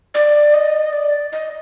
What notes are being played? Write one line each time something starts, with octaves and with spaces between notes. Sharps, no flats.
D5
D#5
D5
D#5